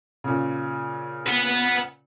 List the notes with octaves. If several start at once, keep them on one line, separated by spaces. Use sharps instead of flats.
A#2 C#3
B4 F#5